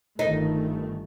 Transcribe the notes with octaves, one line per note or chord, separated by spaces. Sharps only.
G1 D#3 A3 D#4